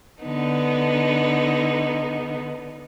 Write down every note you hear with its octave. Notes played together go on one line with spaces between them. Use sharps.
D3 B3 D#4